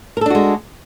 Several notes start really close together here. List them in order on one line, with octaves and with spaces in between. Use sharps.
A#4 A4 D4 F#4 G#3